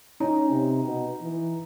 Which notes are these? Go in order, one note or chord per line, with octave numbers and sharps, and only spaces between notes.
C#4 D#4
C3
B2
E3